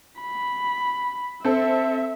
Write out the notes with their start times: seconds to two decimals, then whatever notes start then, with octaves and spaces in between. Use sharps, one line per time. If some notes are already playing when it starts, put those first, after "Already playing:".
0.21 B5
1.45 C4 A4 E5